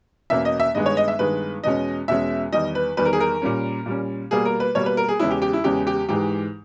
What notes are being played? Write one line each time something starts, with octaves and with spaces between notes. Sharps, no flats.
E2 B2 A#3 C#4 E5
D#5
E5
G2 D#3 G#3 B3 D#5
C#5
D#5
E5
G2 D#3 G#3 B3 B4
E2 B2 G#3 C#4 D#5
E2 B2 G#3 C#4 E5
E2 D#3 G3 D#5
B4
E2 D#3 G3 B4
A#4
G#4
A#4
A#2 G3 C#4
A#2 G3 C#4
B2 G3 A#3 G#4
A#4
B4
B2 G3 A#3 C#5
B4
A#4
G#4
E2 C#3 G#3 C#4 E4
G4
G4
E4
E2 C#3 G#3 C#4 G4
G4
G#2 E3 G#3 G4